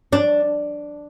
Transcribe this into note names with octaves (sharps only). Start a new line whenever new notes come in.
D4